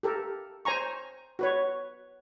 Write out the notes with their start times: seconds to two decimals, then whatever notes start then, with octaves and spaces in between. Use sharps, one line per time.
0.03 G4 A4 A#4
0.65 C5 G#5 A#5 C#6
1.39 F#4 B4 C#5